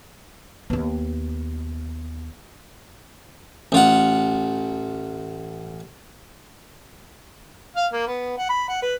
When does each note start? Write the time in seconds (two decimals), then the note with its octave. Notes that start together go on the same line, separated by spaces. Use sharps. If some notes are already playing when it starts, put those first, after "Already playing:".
0.70 D#2 B3
3.72 A1 F4 F#5
7.76 F5
7.93 A#3
8.07 B3
8.38 F#5
8.49 B5
8.69 F#5
8.82 B4